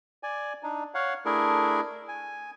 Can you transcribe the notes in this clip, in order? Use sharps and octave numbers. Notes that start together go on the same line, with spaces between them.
D5 G#5
D4 D#4
C#5 F5 F#5
A3 D4 E4 G#4 A#4
G#5